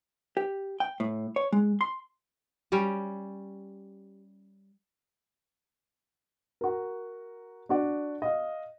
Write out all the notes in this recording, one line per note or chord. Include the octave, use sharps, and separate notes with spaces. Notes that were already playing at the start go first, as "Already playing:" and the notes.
G4
G5
A2
C#5
G#3
C6
G3 C#4 G4
F#4 A#4
D4 F#4 D5
D#5 F5